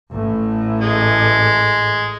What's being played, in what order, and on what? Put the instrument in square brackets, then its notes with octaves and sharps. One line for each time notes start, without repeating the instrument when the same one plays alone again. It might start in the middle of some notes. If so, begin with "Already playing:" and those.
[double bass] A1 A2
[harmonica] G#3